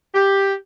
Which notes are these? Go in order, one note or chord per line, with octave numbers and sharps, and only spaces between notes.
G4